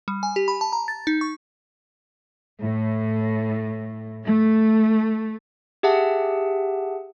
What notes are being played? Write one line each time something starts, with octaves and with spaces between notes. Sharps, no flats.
G3
G#5
G4
B5
A5
A#5
A6
D#4
C#6
A2
A3
G4 G#4 E5 F#5 A5